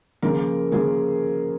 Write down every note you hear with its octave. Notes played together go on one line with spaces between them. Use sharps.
C#3 F3 A#3 A#4
C#3 F3 A#3 G#4